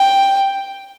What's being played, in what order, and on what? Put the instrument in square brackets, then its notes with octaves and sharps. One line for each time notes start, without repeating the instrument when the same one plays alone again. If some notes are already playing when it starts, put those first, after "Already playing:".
Already playing: [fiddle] G5